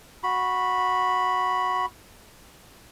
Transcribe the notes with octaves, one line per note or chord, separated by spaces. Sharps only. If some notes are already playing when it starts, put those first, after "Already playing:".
F#4 B5